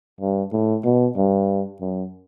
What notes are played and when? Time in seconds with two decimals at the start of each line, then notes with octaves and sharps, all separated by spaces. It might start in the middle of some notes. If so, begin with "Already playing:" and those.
0.20 G2
0.53 A2
0.85 B2
1.17 G2
1.80 F#2